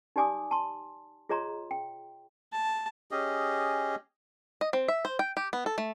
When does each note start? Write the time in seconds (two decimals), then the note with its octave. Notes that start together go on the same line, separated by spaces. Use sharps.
0.16 D#4 G4 D5 G#5 D6 D#6
0.51 A5 C6
1.29 F4 G#4 C#5 D#5 A#5 C6
1.71 G5
2.53 A5
3.11 C#4 G4 G#4 D#5
4.61 D#5
4.73 C4
4.88 E5
5.05 C5
5.19 G5
5.37 G4
5.53 B3
5.66 A4
5.78 A3